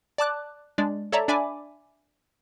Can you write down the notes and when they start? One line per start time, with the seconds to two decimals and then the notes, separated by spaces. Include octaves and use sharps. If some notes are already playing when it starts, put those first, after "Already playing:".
0.18 D5 A5 D6 F#6
0.78 G#3 D4 D5
1.12 A4 C#5 D5 E5 A5 A#5
1.28 D4 D5 E5 G#5 B5 D6